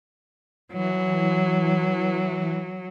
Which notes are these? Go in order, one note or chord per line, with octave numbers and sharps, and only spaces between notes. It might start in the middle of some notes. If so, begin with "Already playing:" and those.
E3 F#3